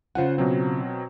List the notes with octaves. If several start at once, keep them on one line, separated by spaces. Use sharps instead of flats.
C#3 F4 C5 F#5 G#5
B2 F#3 C4